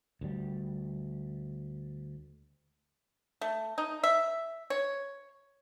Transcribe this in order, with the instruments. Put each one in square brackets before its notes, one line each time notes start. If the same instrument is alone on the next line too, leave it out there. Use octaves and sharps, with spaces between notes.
[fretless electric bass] D2 G3
[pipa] A3
D#4
E5
C#5